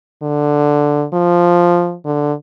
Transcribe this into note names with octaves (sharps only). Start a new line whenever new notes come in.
D3
F3
D3